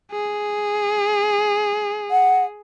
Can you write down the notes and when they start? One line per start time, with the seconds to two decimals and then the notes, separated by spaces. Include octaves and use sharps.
0.11 G#4
2.11 F#5